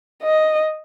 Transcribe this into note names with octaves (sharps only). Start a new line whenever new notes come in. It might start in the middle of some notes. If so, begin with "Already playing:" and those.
D#5